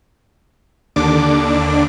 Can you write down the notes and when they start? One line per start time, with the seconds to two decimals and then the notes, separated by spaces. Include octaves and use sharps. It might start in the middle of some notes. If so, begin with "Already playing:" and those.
0.96 D#2 D3 D4 D6